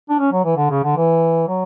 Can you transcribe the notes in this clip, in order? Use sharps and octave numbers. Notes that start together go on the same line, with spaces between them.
D4
C#4
F#3
E3
D3
C#3
D3
E3
F#3